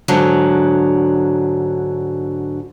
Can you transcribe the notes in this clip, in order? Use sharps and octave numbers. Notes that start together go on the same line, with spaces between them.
G#2 D3 F#3